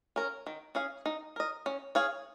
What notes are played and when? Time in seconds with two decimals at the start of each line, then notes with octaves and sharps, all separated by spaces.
0.16 C#4 A#4
0.47 D#3
0.75 C#4 G#4 F5
1.06 D#4
1.36 A#4 D#5
1.66 C#4
1.95 G#4 C#5 F5